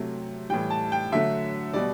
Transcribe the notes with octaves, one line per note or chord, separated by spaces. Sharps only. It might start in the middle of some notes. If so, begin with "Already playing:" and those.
Already playing: C3 F#3 A3
A2 E3 G3 G5
A5
G5
D3 F#3 A3 E5
B2 G3 D5